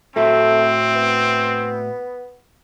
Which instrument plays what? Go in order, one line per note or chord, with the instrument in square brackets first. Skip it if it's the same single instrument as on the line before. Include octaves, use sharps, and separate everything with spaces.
[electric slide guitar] A2 F#4 E5 [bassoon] A3 [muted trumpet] C4
[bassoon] B3